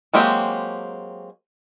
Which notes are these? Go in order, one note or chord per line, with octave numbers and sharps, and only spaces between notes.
F#3 G#3 A#3 C4 G4